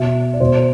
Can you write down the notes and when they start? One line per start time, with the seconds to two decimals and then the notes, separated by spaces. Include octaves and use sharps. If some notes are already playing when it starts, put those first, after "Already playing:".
Already playing: B2 E5
0.33 D5
0.40 B2 C5